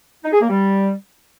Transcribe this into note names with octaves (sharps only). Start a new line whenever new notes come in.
D#4
G#4
A#3
G3